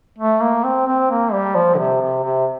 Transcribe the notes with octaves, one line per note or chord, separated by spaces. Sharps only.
A3
A#3
C4
C4
A#3
G3
F3
D3
C3
C3
C3